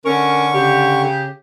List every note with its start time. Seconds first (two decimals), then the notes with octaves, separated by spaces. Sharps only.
0.05 D3 C#4 A#4 C#6
0.54 C#3 G4